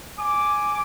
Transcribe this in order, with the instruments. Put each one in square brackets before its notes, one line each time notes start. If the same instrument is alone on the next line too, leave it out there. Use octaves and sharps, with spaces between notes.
[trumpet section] G#5 D6